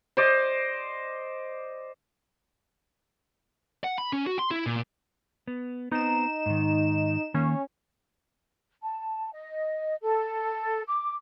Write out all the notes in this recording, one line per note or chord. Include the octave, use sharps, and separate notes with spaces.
C5 D5 D#5
F#5
B5
C#4
F#4
C6
E4
A#2
B3
B3 C4 D#4 E7
G#2 D#3
D#3 A#3 C#4
A5
D#5
A4
D6